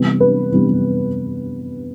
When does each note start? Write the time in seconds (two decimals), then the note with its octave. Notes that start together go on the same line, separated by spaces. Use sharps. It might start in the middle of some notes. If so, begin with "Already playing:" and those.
Already playing: C3 E3 G3 B3
0.20 B4
0.52 C3 E3 G3 B3